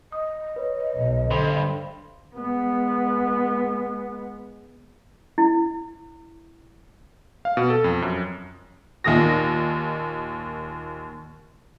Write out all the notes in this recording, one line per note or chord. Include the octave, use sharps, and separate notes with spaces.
D#5 D#6
B4 C#5
B1
G2 D3 C5 B5 C6
G#3 B3
E4
F5
B2
A4
F2
F#2
D#2 A#2 D#3 D#6 A#6